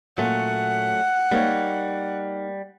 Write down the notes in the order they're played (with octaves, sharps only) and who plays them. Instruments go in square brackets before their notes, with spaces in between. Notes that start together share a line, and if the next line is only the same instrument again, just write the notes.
[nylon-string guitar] A#2 [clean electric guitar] F#3 A3 C#4 [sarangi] F#5
[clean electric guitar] G3 [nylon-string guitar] A#3 D#4 C#5